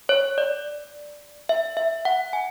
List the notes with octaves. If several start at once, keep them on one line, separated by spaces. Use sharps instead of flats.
C#5
D5
E5
E5
F#5
G#5